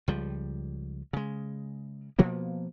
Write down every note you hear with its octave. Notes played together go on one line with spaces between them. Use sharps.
C#2 F3 G3
C#3 G#3
B2 F3 A#3 B3